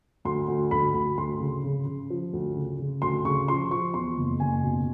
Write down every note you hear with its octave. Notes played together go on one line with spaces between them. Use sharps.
D2 C6
D2
D2 B5
D2
D2 C6
C#3
C#3
C#3
F3
D2
C#3
C#3
D2 C6
C#3 C#6
F3 C6
F3 C#6
E2 C6
F#1
F#1 G#5
B2